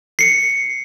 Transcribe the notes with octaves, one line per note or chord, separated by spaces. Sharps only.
C7 C#7